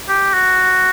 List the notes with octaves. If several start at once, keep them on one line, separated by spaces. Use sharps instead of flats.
G4
F#4